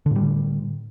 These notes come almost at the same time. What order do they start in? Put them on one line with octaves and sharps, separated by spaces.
D3 A2 G3